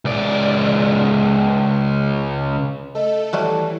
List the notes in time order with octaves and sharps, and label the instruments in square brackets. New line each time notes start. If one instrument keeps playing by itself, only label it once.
[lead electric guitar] C#2 D5
[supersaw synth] A3 A4 [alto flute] D#5
[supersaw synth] E3 [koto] F#3 G3 A3 [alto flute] A5